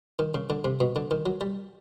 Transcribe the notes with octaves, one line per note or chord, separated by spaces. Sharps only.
D#3
C#3
D3
C3
B2
D3
D#3
F#3
G3